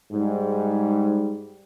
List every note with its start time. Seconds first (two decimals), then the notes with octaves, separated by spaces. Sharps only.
0.12 G#2 G3